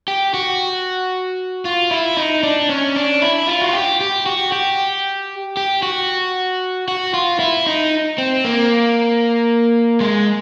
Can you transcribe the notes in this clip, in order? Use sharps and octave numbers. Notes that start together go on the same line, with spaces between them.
G4
F#4
F4
E4
D#4
D4
C#4
D4
E4
F4
F#4
G4
G4
F#4
G4
G4
F#4
F#4
F4
E4
D#4
C4
A#3
G#3